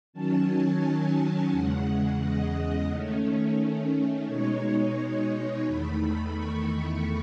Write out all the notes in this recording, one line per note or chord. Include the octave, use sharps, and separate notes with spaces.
D#3 F#3 C#4 A5
G#5
E2 C#3 G#3 F#5
D#5
D#3 A3 C#4
B2 G#3 D#4 C#5
E2 D#3 A3 B5
C#6